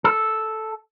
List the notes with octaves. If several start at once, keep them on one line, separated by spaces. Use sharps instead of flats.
A4